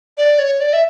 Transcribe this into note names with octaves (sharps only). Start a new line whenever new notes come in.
D5
C#5
D5
E5